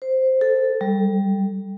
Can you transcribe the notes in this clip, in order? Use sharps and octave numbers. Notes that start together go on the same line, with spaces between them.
C5
A4
G3